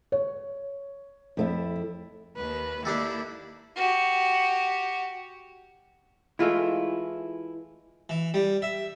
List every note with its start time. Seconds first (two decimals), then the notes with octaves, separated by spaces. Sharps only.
0.12 C#5
1.37 F2 A3 E4
2.36 D#2 D#3 B4
2.85 D#3 A#3 D4 E4 G4 A4
3.76 F#4 G4
6.39 E3 G#3 A3 E4 F4
8.09 E3
8.34 G3
8.62 E5